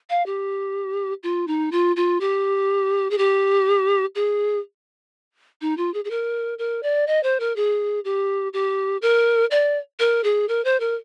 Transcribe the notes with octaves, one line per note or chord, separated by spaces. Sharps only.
F5
G4
F4
D#4
F4
F4
G4
G#4
G4
G#4
D#4
F4
G#4
G#4
A#4
A#4
D5
D#5
C5
A#4
G#4
G4
G4
A#4
D5
A#4
G#4
A#4
C5
A#4